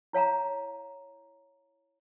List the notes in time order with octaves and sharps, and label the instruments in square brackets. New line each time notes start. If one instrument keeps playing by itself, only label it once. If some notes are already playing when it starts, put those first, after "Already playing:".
[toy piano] E4 C#5 F5 A5 A#5